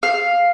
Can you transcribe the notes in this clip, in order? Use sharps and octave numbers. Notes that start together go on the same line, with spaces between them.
F5